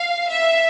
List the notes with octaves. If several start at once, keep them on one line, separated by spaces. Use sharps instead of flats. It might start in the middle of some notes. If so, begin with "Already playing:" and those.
Already playing: F5
E5